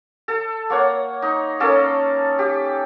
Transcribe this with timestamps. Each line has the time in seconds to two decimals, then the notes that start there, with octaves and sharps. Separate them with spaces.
0.28 A4
0.70 A#3 C#5 F#5
1.22 D#4
1.60 A#3 C#4 A4
2.39 G4